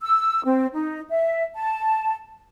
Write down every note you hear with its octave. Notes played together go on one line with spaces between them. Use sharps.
E6
C4
D#4
E5
A5